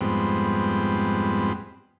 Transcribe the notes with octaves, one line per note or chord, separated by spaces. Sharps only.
F2 G#2 G3 B3 C4